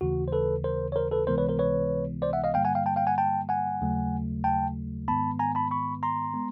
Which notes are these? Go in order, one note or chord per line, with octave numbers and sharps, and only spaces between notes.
D#2 C#3 E3 A3 F#4
C5
A4 B4
A#4 C5
C#5
A#4 C5
A4 B4
C#2 C3 E3 G#3 B3 A#4 C5
B4 C#5
A#4 C5
B4 C#5
C5 D5
E5 F#5
D#5 F5
G2 D3 G3 A#3 F5 G5
F#5 G#5
F5 G5
G5 A5
F5 G5
F#5 G#5
G5 A5
F#5 G#5
D#2 C#3 F#3 A3
G5 A5
G#2 D#3 G#3 B3 A5 B5
G#5 A#5
A5 B5
B5 C#6
A#5 C6
G#3 B3